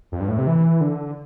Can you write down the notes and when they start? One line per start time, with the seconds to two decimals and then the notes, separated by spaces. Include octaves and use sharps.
0.12 F2
0.20 G2
0.29 A2
0.38 C3
0.47 E3
0.81 D3